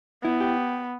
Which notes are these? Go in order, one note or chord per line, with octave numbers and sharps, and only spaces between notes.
B3 E4
G4